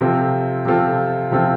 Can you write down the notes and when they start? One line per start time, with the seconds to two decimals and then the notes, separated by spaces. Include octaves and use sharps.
0.01 C3 F3 C4 F4 A4
0.65 C3 F3 C4 F4 A4
1.31 C3 F3 C4 F4 A4